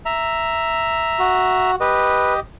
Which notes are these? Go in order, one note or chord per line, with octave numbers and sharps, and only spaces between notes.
E5 A#5
F#4
G4 B4 D#5